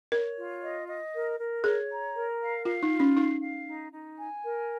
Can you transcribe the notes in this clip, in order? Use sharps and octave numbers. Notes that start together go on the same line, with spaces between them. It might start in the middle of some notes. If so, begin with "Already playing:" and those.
A#4 C#5
F4
D#5
D#5
A#4
A#4
G#4 C#5
A#5
A#4
F5
F4 F5
D#4
F4
C#4
D#4 F5
F5
D#4
D#4
G#5
A#4